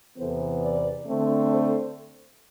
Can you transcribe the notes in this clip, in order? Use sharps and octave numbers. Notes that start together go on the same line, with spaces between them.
E2 C3 E3 B3 A4 C5
B4 D5
D3 A3 C4
A4 C5